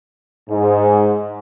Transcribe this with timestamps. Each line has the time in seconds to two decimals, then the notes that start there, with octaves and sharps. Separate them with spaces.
0.49 G#2